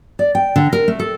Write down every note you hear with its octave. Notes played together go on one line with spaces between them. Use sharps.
D5
G5
D3
A#4
A3
A4